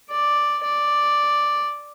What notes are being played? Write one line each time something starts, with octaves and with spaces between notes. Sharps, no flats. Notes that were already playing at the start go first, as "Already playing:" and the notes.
D5
D5